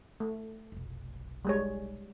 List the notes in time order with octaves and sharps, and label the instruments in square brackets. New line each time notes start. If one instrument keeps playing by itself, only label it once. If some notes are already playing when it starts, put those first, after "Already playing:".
[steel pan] A3
[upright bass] F1 B1
[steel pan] G3 G#3 C#5